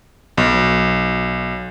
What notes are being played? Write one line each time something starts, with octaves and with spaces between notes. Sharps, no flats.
B1